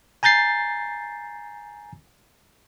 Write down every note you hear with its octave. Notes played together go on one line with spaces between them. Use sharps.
G#5 A#5 G6 A6 C7